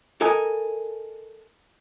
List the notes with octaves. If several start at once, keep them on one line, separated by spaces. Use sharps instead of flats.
A4 A#4 D#5 G#5